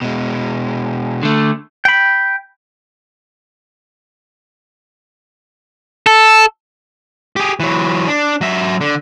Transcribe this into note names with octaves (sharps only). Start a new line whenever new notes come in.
B2 G#3
D3 A3
G5 B5
A4
G4 G#4
E3 F#3
D4
F#3 E5
D3